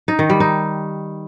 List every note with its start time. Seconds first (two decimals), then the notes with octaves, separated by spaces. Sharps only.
0.08 D#4
0.19 D#3
0.30 G3
0.40 D#4